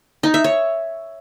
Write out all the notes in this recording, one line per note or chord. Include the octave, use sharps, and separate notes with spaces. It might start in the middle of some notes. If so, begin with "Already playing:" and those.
D#4
E5
C#5